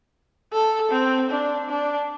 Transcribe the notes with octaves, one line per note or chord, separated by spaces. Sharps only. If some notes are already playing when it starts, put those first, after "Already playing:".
A4
C4
D4
D4